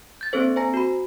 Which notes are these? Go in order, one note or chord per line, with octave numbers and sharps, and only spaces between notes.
G6 A6
A#3 C4 D4 A4 C5
C5 G#5 A#5 A#6
F#4 B5